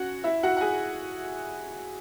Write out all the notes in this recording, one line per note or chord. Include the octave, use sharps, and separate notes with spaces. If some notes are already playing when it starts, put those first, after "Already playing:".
Already playing: C#4 F#4 F#5
E4 E5
F#4 F#5
F#5
G#4 G#5